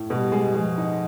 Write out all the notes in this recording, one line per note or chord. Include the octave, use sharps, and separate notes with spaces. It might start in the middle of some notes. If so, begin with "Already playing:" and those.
Already playing: A2
B2 G3
G#3
F3 G#3
D#4